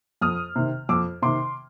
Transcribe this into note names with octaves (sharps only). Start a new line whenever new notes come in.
F2 D#6 F6
C3 D#3
F2 D6 E6
C3 D#3 C6 D6